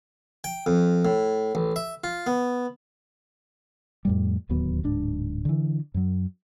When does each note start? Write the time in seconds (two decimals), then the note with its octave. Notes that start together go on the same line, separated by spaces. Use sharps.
0.44 G5
0.66 F2
1.05 A2
1.55 A1
1.76 E5
2.04 F4
2.27 B3
4.05 F2 A2 G3
4.49 D1 D#2 F#3 B3
4.84 D1 G#2 D4
5.45 D3 E3
5.94 F#2 F#3